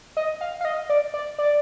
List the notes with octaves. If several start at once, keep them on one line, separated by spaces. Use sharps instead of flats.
D#5
F5
F5
D#5
D5
D5
D5